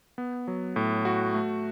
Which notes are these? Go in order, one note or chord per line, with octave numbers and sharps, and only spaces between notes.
B3
F#3
A2
F#4
A3